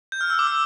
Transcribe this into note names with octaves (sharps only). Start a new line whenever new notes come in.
G6
F6
E6
D6
E6